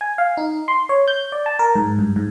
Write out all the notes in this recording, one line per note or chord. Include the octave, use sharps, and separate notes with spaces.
G#5
F5
D#4
C6
C#5
G6
D5
A5
A#4
G#2
G2
G#2